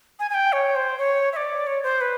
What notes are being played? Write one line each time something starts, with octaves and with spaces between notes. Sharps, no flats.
G#5
G#5
G5
C#5
C5
C#5
E5
D5
C#5
C5
B4